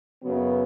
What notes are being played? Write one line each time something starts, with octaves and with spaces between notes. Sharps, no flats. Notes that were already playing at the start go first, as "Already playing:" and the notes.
F#2 C#3 F#3 B3